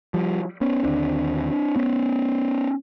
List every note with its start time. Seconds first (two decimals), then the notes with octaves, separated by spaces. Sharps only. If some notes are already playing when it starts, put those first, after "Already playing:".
0.14 F3 G3
0.61 B3 C#4
0.84 D#2 D3 C4 D4
1.76 B3 C#4